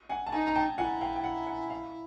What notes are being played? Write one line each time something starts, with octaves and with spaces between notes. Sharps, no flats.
F#5 G#5
A5
D#4 G#5 A#5
A#5
G5 A5
F4 F#5 G#5
E4
F5 G5
G5
F#5
F#5
F5